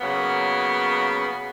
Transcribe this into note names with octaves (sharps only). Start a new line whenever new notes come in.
C#3 F#3 A#3 B3